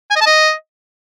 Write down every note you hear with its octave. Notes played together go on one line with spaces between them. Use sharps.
G#5
D#5
A5
D#5